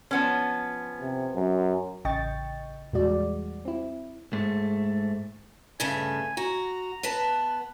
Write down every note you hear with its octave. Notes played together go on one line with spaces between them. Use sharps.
F3 B3 C#4
C3
F#2
A1 C#3 D#5 G5 C#6 A6
E2 A#2 G3 G#3 F#4 D5
C4 E4
G#2 A3
G2 C#3 A3 G#5
F#4 A#5
B3 B4 A5